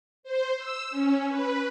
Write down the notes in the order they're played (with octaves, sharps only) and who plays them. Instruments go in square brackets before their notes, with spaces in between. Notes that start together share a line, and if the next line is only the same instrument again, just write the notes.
[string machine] C5
E6
C#4
B4